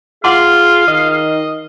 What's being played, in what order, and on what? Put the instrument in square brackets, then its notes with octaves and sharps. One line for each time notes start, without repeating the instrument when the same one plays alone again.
[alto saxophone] F4 [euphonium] G#4 [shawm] F5 [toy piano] F#5 C6 D6
[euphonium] D#3 [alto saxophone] D#5